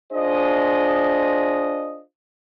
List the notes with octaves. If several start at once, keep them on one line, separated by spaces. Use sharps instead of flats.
D4 F4 G#4 C5 D#5